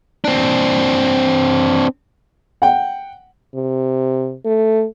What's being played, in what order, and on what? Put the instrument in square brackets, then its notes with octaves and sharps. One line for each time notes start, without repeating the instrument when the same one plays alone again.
[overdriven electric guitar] C4 D4
[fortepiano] F#5 G5
[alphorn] C3
A3